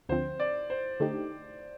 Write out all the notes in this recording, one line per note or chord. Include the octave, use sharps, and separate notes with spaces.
D2 D3 F3 C4 C5
D5
C5
D3 A3 D#4 G4